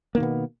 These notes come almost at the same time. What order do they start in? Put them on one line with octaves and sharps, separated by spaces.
A#3 D#3 B2 B3